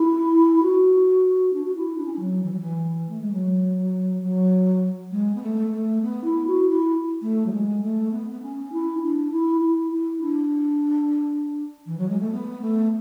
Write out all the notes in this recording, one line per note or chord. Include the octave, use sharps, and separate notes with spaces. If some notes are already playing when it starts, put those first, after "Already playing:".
Already playing: E4
F#4
D4
F#4
E4
D4
C#4
D4
F#3
E3
F#3
E3
A3
G#3
F#3
F#3
G#3
B3
A3
A3
B3
E4
F#4
E4
A3
F#3
G#3
A3
B3
B3
C#4
E4
C#4
D4
E4
E4
E4
D4
E3
F#3
G#3
A3
B3
A3